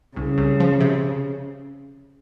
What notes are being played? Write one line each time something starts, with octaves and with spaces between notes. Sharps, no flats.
C2 C#3
C2
F3
C3